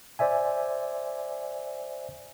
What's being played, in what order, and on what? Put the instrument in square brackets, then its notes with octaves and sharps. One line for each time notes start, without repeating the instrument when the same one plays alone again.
[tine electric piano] C5 D5 E5 G#5